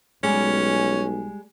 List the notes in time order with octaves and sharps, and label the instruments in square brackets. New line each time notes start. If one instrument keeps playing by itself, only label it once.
[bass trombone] B1 [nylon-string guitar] G3 G#3 [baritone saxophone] C#4